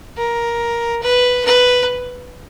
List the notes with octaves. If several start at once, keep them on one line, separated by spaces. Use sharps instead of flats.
A#4
B4
B4